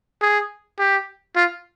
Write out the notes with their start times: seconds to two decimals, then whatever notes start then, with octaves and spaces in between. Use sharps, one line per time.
0.22 G#4
0.79 G4
1.36 F4